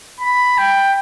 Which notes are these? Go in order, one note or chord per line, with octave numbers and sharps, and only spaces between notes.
B5
G5